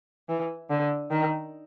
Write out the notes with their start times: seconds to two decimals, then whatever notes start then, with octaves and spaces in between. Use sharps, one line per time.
0.29 E3
0.70 D3
1.11 D#3